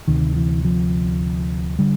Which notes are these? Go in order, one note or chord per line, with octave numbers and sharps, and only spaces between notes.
D2 C3 D#3
E3
F3
D3 G3